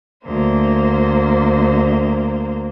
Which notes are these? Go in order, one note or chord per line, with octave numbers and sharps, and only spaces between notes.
D2 A#3 C5